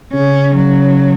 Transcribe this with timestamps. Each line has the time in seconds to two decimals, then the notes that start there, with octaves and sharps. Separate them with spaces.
0.14 C#3 C#4
0.55 F#3